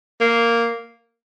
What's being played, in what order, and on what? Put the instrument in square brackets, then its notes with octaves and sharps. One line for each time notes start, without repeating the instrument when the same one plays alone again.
[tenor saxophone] A#3